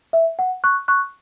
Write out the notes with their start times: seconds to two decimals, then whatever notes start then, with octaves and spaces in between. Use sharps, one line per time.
0.13 E5
0.39 F#5
0.64 C#6 F#6
0.88 C#6 F#6